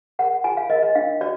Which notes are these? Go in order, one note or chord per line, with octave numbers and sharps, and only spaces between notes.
A#4 F#5
F4 G#5
F5
A#4 D#5
D#5
D4 F5
F#4 D5